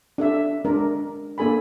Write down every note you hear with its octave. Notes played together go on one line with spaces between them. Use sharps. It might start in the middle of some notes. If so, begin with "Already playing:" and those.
D4 A4 E5
G#3 D4 A#4
A#3 D4 A4 G#5 B5